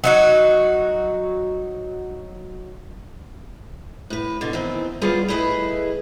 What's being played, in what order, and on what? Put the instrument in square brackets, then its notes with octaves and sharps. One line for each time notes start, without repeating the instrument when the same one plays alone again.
[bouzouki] F#3 D#4 F#4
[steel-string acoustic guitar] A2 B4
B2 D3
D#3 E3 C4
G3 B3 C#4 D4 F4 G#4
A3 E4 G#4 B4 D#5